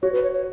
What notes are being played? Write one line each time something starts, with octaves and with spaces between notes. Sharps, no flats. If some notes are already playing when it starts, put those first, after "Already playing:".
F#4 C#5
B4
C#5
C#5